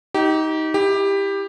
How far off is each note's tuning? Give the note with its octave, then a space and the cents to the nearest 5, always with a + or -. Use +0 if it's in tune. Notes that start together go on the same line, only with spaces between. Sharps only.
D#4 +20 G4 -25
E4 -10 G4 +15